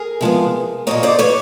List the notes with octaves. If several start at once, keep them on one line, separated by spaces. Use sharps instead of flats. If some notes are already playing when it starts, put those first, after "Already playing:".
Already playing: G#4 A#4
C3 F3 G#3 B3
A#2 F3 A#3 C#5 D#5
C5 D5
B4 C#5